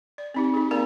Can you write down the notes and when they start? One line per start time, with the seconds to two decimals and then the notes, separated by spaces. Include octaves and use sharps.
0.18 D5
0.34 C4 D#4 G4
0.54 D#4 G#4
0.71 A#3 C4 A#4 D5 G#5 A#5